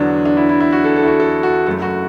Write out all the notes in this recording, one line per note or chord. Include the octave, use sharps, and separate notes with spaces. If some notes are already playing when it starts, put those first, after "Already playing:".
Already playing: E2 D3 F#3 D4
D4
E4
E4
E4
F#4
A4
A4
E4
F#4
A4
F#4
F#1 F#2 F#3 A3 A4
F#4